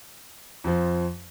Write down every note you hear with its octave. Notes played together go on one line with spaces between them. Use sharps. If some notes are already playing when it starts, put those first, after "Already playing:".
F2 F3